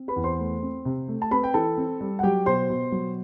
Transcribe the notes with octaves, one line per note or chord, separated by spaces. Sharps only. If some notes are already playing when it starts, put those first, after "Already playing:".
Already playing: C4
B4 B5
E2
C5 C6
A3
C4
C3
A3
A5
C4 B4 B5
G5
E3 A4 A5
C4
G3
F#5
F#3 G4 G5
B2 C5 C6
B2
F#3